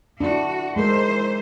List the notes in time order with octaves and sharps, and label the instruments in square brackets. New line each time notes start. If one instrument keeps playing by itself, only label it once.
[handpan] D4 E4 [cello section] F#4
[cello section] E3 C5 [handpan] G#3 A#4